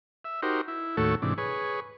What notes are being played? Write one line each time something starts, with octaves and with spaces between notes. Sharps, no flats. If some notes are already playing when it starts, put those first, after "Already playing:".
E5
D#4 F#4 G4 A#4 C5
E4
D#2 A2 A3 F#4 A4 C#5
G#2 C3 E3 D4
G#4 B4 C#5